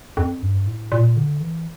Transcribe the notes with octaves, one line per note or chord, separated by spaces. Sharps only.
F2
G2
A2
A#2
D3
E3